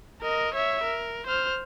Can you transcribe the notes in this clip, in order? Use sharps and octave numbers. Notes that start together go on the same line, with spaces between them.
A#4 D#5
C#5 E5
A#4
C5 F6